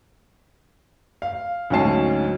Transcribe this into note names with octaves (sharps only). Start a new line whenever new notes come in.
F5
D2 G#2 F#3 C#4 A5 C7